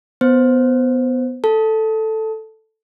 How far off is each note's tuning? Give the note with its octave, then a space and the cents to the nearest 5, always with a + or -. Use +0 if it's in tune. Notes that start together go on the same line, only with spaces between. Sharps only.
B3 +10 C5 +0
A4 +0 A5 +0